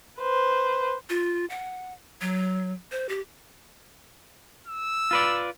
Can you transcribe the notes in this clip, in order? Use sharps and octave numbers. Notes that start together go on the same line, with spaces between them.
B4 C5
F4
F#5
F#3
C5
G4
E6
F4 B4 D5